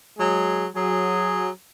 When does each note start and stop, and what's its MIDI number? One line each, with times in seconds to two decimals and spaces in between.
0.19 0.65 54
0.19 0.65 56
0.19 0.65 68
0.75 1.48 54
0.75 1.48 68